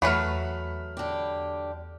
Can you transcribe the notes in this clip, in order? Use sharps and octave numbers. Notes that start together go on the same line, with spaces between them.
E2 F#3 A3 B4 B5 F6
D3 G4